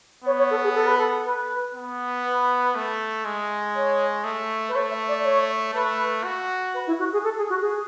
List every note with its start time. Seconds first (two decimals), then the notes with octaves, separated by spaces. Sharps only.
0.25 B3 C#5
0.38 C#5
0.50 A4
0.63 G#4
0.74 A4
0.86 B4
0.97 A4
1.24 B4
1.75 B3
2.25 B4
2.75 A3
3.25 G#3
3.75 C#5
4.24 A3
4.68 B4
4.75 A3 C#5
4.91 E5
5.08 D5
5.24 C#5
5.74 A3 B4
6.24 F#4
6.74 B4
6.87 E4
6.99 F#4
7.12 G#4
7.24 A4
7.37 G#4
7.49 F#4
7.61 G#4